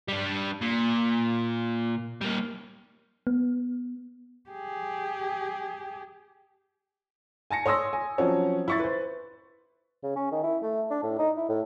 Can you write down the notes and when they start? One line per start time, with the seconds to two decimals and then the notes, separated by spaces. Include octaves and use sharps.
0.08 G3 D4
0.62 A#2
2.21 G3 A#3
3.27 B3
4.50 G4 G#4
7.51 G#5 A5 A#6 C#7
7.66 C#5 C6 D#6 E6 A#6
7.93 G#5
8.18 F3 F#3 C4 C#4 C#5
8.68 E4 C#6 A6
8.79 B4 C5
10.03 C#3
10.16 C#4
10.32 D#3
10.43 E4
10.63 A3
10.90 D4
11.03 A2
11.18 D#4
11.37 E4
11.49 A2